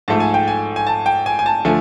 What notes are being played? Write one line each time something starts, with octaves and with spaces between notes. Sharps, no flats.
G#2 F3 A3 A5
G#5
G5
G#5
G#5
A5
G5
G#5
G#5
A5
D3 F3 A3 G#5